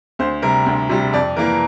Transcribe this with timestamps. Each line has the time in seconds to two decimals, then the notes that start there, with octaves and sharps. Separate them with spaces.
0.19 D2 C5
0.42 C3 G3 A#4
0.66 D2
0.89 C3 G3
1.13 F2 D5
1.36 E3 A#3 A#4